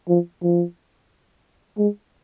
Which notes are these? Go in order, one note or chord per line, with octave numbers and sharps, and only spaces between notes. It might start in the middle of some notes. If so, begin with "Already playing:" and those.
F3
F3
G#3